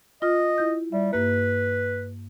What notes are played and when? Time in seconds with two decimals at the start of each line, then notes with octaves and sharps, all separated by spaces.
0.22 F4 D#5 F6
0.58 E4 G6
0.92 G3 E5
1.13 G2 A#3 B4